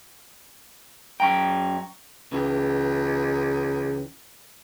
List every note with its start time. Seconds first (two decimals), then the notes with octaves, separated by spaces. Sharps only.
1.20 F#2 G5 A#5 C#6
2.32 C#2 C#3 E3 G4